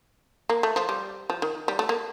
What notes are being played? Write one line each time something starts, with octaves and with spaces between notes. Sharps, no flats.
A#3
A3
F3
G3
F3
D#3
G3
A3
A#3